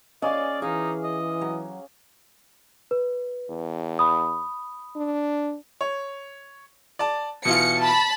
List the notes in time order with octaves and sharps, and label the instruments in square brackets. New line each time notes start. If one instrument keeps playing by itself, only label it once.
[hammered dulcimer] C#4 G#4 D6 [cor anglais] D5 [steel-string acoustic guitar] D#5 F5
[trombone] E3 [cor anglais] D#4 [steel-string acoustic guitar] G#4 [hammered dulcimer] F5
[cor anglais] D#5
[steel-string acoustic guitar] F#3
[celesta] B4
[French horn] E2
[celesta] B5 D#6
[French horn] D4
[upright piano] C#5
D5 A5
[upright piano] B2 E3 F4 [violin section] C#7
[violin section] A5 B5